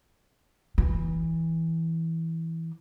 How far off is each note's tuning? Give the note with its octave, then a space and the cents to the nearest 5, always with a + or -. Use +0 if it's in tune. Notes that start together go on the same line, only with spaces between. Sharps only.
E3 -10